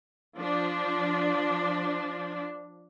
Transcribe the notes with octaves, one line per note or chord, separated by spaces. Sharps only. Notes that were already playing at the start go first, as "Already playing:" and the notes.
F3 D4